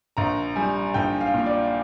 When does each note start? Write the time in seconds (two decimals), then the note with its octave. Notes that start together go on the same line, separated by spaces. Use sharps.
0.17 A#1 A#5
0.56 G3 G#5
0.94 A#1 G5
1.21 F5
1.34 A#2
1.46 D5